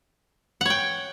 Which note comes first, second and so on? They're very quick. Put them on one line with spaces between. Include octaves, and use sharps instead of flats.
F#5 C#5 G5